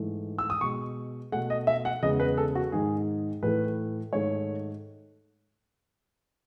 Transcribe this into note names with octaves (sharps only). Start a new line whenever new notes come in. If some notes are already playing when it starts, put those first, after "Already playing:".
Already playing: G#2 E3 A3
E6
D#6
B2 G#3 C#6
B2 A3 F#5
D#5
E5
F#5
E2 C#3 G#3 D#5
B4
A4
F#4
G#2 D#3 G#3 G#4
A2 E3 A3 B4
G#2 D#3 A3 C#5